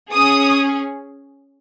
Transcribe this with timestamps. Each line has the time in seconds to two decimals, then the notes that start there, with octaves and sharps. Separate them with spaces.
0.11 C#4 G#4 D#6